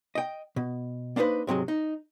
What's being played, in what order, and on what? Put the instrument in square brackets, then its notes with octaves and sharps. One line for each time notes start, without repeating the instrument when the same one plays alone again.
[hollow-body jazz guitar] D#5 G5
B2
A#3 D4 D#4 A4 B4 C5
G#2 C3 F#3 G#3
D#4